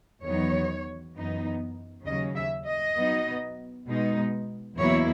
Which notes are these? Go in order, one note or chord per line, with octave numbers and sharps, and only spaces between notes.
E2 D#3 F#3 B3 D#4 C#5
F#2 E3 B3 D#4
D#2 C#3 F#3 C#4 D#5
E5
D#5
B2 F#3 B3 D#4
B2 G#3 B3 D#4
E2 B2 F#3 A#3 E4 C#5